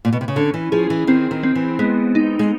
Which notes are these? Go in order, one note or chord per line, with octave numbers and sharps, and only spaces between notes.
A#2
B2
C3
C#3
D3 C#4
E3
F3 G#4
E3
D#3 C4
D#3
C4
E3
G#3 B3
D#4
G#3